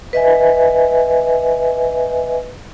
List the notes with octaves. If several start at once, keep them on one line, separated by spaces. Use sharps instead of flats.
B4 D#5 E5 G#5